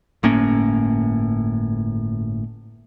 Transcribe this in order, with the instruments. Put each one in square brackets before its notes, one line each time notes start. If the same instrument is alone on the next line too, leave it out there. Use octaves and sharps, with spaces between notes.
[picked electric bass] G1 A2 A#3 C#4